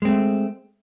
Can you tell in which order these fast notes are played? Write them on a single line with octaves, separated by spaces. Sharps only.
G#3 C4 A3